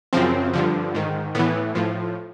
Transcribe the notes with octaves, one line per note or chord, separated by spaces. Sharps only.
F#2 C#3 F3 C4
G2 D3 F3
G#2 D#3
A2 E3 B3
A2 F3